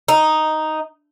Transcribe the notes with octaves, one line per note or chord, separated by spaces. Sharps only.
D#4